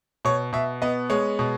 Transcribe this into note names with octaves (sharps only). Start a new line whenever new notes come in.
B2 C#5
B2 E5
B3 D#5
G#3 C#5
B2